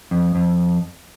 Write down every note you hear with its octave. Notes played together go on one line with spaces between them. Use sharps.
F2
F2